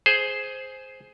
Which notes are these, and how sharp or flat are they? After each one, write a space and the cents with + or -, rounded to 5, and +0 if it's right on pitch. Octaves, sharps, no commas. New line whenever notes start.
G#4 +10 C5 +0